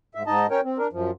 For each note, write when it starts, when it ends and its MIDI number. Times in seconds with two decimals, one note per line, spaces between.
0.15 0.23 44
0.15 0.23 76
0.26 0.47 44
0.26 0.47 63
0.26 0.47 75
0.26 0.47 81
0.51 0.61 61
0.51 0.61 70
0.51 0.61 73
0.51 0.61 79
0.64 0.78 60
0.78 0.87 62
0.78 0.87 70
0.93 1.11 42
0.93 1.11 53